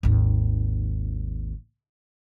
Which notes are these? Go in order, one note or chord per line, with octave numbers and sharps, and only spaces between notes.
G#1 D#2